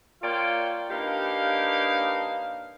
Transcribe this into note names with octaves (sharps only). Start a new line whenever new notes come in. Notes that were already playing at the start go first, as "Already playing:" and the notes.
A#3 F4 C#5 D5 F5 G5
A#3 D4 D#4 G4 B4 F5